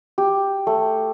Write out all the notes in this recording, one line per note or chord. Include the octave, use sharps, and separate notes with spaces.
G4
A3